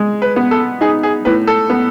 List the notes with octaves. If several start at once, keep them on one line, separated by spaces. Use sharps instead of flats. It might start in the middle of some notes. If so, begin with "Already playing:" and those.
Already playing: G#3
B4
B3
A4
D#4 G#4
G#4
A2 B4
A4
B3